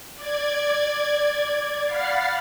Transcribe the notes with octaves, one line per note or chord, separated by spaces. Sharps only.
D5 G#6
F5 F#5 B5 F6 A6 C7